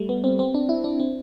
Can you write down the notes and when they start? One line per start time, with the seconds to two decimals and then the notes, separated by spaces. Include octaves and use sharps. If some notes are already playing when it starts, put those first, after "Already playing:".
Already playing: G3 A3
0.09 B3
0.24 C4
0.39 C4
0.54 D4
0.69 E4
0.84 D4
1.00 C4